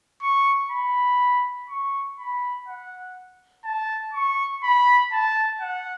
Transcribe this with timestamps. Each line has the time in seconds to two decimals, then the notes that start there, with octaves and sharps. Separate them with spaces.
0.22 C#6
0.71 B5
1.69 C#6
2.19 B5
2.68 F#5
3.64 A5
4.13 C#6
4.63 B5
5.12 A5
5.61 F#5